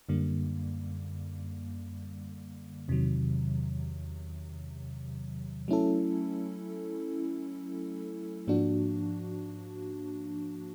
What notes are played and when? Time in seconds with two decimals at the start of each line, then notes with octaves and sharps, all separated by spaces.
0.09 F#2 D3 G3 A#3
2.88 E2 C3 D#3 F#3
5.68 F#3 A3 C#4 E4 A4
8.47 G#2 F3 A#3 D4 F#4